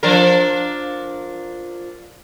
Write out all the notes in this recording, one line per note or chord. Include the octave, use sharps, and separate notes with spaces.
F3 D4 A#4